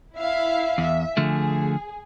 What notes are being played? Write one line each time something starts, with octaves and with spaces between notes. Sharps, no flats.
E4 E5 F5
E2 E5
D3 F3 A3 G#4